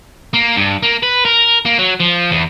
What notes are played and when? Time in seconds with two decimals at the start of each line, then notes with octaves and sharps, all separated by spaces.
0.34 A#3
0.57 G2
0.83 A#3
1.03 B4
1.25 A#4
1.66 A#3
1.79 F#3
2.00 F3
2.31 E2